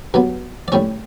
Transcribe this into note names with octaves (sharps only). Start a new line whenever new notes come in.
G2 F#3 B3
D5
A2 G3 C#4 C#5